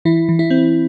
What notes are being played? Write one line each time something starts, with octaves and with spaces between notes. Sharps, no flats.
E3 E4
E3
E4
C4